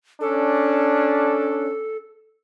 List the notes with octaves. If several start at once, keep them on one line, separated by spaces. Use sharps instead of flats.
C#4 D4 A4